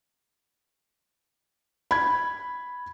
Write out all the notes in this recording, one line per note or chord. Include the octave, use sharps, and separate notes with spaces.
B5 G#6